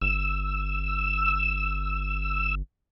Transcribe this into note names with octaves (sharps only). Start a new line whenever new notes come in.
G1 E6